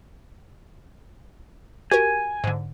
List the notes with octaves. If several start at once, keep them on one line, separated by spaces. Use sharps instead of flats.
F#4 G4 A#4 G#5
G#2 D3